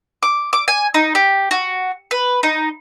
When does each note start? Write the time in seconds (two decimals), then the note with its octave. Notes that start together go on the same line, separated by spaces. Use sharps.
0.23 D6
0.53 D6
0.68 G#5
0.94 D#4
1.15 G4
1.51 F#4
2.11 B4
2.43 D#4